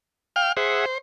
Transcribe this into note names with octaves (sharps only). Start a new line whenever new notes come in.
F5 G5 F6
G#4 C5 E5 F#5